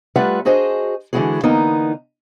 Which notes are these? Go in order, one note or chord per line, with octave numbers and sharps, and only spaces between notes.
G3 A3 F4 B4 E5 F#5
D4 F#4 G#4 C5 D#5
D3 E3 G#3 E4 F#4 G#4
D3 E3 A#3 B3 D#4 A#4